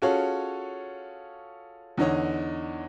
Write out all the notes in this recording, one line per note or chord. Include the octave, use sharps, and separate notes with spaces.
C#4 F4 F#4 G#4 A4 C#5
E2 D3 D#4 C#5 D#5